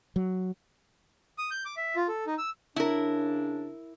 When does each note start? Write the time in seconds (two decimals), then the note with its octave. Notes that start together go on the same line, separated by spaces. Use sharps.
0.16 F#3
1.38 D#6
1.51 G6
1.65 D6
1.77 E5
1.96 F4
2.08 A4
2.27 D#4
2.38 E6
2.76 C#3 D4 E4 A#4